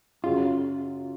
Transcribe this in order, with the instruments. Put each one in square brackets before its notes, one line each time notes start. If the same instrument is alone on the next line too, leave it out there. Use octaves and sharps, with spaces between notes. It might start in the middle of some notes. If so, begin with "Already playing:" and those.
[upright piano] F#2 C#3 F#3 [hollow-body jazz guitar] F4